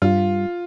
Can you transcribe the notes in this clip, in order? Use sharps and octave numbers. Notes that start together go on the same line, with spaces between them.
G2 F4